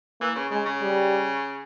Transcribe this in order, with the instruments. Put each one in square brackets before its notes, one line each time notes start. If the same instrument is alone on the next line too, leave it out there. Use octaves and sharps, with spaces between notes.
[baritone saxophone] E3 [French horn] A#3
[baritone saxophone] C#3
[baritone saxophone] C#3 [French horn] G#3
[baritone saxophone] C#3
[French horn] G3